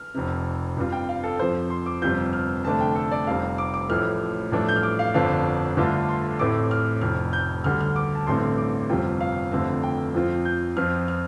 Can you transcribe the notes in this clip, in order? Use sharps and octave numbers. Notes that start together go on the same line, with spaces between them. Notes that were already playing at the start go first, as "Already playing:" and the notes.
Already playing: F6
F1 F2 C3
G2 G3 C4 F4
G5
F5
A4
F2 F3 C4 C5
C6
D6
G1 F2 C3 G3 F4 G6
F6
F1 F2 D3 A3 D4 A5
G5
A4
D5
F1 F2 C3 G3 C4 F5
D6
D6
A1 A2 F3 A3 F6
A1 G2 F3 A3 D4
G6
F6
D6
F5
G1 F2 D3 F3 D4 F5
G2 D3 A3 D4 F4
C6
A1 A2 A3 C4 D6
F6
F1 F2 C3 F6
G6
D2 D3 G3 F6
F6
D6
A5
A1 G2 D3 A3 C4 C6
D6
G1 F2 C3 G3 F4 G5
F5
G1 F2 D3 A3 C4
G5
F2 F3 C4 F4
G6
F2 F3 C4 F4 F6
F6